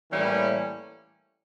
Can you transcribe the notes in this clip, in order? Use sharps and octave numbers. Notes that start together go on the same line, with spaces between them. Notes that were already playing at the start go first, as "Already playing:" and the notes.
A2 E3 G3 A#3 C#4